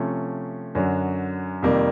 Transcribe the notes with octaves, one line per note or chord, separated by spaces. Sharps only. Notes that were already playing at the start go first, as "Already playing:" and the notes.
Already playing: C3 F3 A3 C#4
F#2 D3 F#3
F2 C3 D#3 G3 A#3